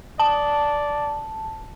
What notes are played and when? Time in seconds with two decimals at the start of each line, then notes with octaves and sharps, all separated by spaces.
0.20 D5 A5